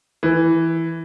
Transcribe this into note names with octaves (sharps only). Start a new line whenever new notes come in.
E3